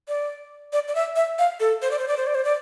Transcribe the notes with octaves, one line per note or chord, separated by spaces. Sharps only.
D5
D5
D5
E5
E5
F5
A4
C5
D5
C5
D5
C5
D5
C5
D5